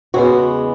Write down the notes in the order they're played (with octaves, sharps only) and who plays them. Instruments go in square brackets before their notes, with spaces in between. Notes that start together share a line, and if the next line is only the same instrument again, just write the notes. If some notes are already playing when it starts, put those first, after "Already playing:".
[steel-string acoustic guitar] E2 C#3 G#3 B3 F#4